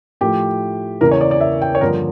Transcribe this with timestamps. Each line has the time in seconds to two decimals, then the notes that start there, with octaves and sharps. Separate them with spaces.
0.21 A2 F3 A3 G4
1.01 E2 C#3 E3 A#3 A#4
1.11 C#5
1.21 D5
1.31 D5
1.41 E5
1.62 G5
1.75 C#5
1.81 G2 D3 F3 A#3 A#4